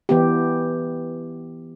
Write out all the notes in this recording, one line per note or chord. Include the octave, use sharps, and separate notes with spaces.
E3 B3 G4